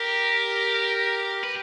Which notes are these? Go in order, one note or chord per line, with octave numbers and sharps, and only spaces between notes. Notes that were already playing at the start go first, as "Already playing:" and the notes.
Already playing: G4 A#4
B4